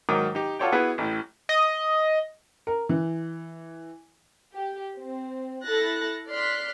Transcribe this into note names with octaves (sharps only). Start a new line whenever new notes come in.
G#2 D#3 F#3 A#4 D6 D#6
D#4 G4
F4 F#4 A4 C#5 D5 G5
B3 E4 F#4 G#4 B4
A1 A2
D#5
A#4
E3
G4
C4
E4 A4 F#6 A6 A#6
D5 C6 F6 F#6 B6